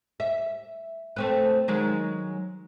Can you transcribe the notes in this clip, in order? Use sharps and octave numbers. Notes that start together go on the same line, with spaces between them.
E5
A3 C4 B4
D#3 F#3 G#3